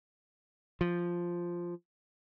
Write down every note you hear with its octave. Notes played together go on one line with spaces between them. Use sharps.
F3